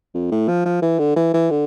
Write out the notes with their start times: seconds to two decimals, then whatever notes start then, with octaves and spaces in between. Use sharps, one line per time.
0.14 F2
0.32 A2
0.48 F3
0.65 F3
0.82 E3
0.99 D3
1.16 E3
1.34 E3
1.51 D3